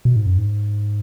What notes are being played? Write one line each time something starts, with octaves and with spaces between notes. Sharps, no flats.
B2
G#2
F#2
G#2